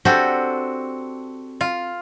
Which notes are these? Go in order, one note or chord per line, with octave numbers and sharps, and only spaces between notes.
C4 D4 F#4 G4 A4
F4